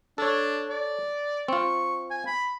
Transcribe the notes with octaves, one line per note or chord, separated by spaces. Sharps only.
D4 A4 C#5
D5
C4 F4 C#6
G#5
B5